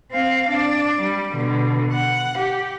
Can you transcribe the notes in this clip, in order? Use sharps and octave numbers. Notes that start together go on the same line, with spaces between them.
C4 F5
D4 D5
G3
B2 D3
F#5
G4